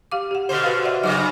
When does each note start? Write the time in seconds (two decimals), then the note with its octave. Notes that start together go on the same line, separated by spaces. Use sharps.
0.12 G4 F5 D6
0.31 G4 F#5
0.49 B2 D3 C5
0.63 F#4 B4 F5
0.84 D5 E5 F#5
1.03 G2 C#3 F#3 D6